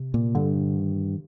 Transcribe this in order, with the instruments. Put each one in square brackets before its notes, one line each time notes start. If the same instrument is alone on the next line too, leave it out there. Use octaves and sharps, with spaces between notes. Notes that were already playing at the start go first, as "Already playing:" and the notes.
Already playing: [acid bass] C3
[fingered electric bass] A#2
[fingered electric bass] G2 [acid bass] D3
[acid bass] D#3